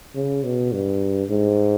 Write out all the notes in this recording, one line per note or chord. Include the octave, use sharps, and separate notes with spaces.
C#3
B2
G2
G#2